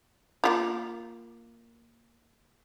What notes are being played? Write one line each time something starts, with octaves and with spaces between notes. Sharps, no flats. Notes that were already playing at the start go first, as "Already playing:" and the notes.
A#3 E4 F4